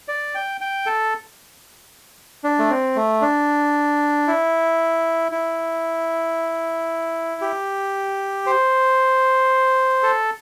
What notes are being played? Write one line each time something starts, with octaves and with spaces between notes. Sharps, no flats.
D5
G5
G5
A4
D4
A3
C4
A3
D4
E4
E4
G4
C5
A4